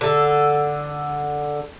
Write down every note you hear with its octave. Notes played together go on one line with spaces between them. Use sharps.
D3 A4